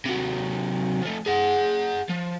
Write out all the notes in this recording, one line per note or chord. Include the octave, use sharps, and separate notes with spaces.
C3 F#3
F3 A3
G#4 F#5
F3